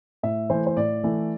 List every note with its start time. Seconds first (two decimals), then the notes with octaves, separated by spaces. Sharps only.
0.23 A2 E5
0.50 E3 A3 C5
0.66 C5
0.77 A2 D5
1.04 E3 A3